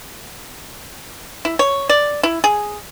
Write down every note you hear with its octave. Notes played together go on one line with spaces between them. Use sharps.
E4
C#5
D5
E4
G#4